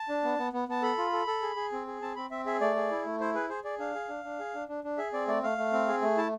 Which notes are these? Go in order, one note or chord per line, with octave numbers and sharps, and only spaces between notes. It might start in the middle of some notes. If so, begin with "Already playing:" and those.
Already playing: A5
D4
B3
B3
B3
B3 A5
A4 B5
F4
A4
A4
G#4
G#4
C4
G#4
C4 A5
C4 B5
C4 E5
G#4 E5
A3 D5
G#4
E4
A3
E4 C5
G#4 B4
G#4 C5
G#4 D5
D4 F5
G#4
D4
D4
G#4
D4
D4
D4
G#4 E5
C4 D5
A3 D5
A3 F5
A3
C4
G#4
A3
E4 A5